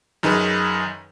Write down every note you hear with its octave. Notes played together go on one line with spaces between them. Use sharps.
F#2 D#3 D#4 G#4 B4